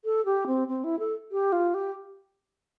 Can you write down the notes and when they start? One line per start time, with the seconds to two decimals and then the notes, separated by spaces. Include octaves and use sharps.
0.05 A4
0.25 G4
0.47 C4
0.68 C4
0.84 E4
0.99 A4
1.32 G4
1.52 F4
1.74 G4